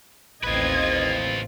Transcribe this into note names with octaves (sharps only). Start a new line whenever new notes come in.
A1 D#2 C4 F4 B4 D#5 G#6